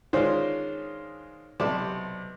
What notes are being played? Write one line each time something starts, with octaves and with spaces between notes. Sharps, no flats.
D#3 G#3 C#4 D4 F4 C5
B1 C3 D5 A5